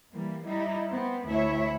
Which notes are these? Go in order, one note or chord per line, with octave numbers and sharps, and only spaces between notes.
E3 G3 A#3
G3 D#4 E4
B3 C4
D2 E4 C#5 E5